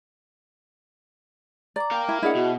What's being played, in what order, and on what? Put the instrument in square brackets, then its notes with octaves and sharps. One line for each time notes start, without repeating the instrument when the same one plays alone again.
[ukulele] D5 [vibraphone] A#5 D6
[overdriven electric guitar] A#4 F5 [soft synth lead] G5
[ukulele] E4
[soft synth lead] D4 [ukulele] E4 G#4 F#5 [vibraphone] D#5
[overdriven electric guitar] B2 [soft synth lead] F#4